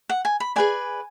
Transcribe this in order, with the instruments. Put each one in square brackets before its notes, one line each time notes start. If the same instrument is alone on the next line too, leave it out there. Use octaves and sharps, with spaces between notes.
[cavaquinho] F#5
G#5
B5
G#4 B4 D5 G#5